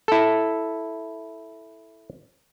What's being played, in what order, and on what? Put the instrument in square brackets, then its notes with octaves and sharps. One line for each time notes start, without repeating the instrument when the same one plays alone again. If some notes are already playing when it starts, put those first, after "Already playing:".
[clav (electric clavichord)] E4 A4